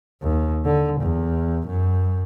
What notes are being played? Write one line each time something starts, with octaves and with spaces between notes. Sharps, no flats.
D#2
D3
E2
F#2